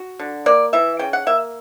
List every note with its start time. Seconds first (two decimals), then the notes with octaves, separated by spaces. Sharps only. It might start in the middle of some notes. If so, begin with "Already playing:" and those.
Already playing: F#4
0.19 D3
0.46 A#3 D5
0.73 E3 E5
0.99 C#3 G5
1.13 F#5
1.27 A#3 E5